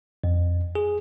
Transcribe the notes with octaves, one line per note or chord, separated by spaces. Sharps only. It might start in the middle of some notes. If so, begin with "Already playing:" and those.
F2
G#4